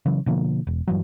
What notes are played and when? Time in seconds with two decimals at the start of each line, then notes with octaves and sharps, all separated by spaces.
0.06 C#3 E3 F#3
0.26 B2 D3 F3 A#3
0.67 E1
0.87 G2 E3 F#3